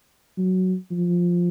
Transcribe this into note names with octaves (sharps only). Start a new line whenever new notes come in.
F#3
F3